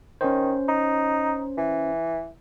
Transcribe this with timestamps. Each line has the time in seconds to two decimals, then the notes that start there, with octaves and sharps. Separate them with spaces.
0.21 D#3 C#4 C5
0.69 D#4
1.58 E3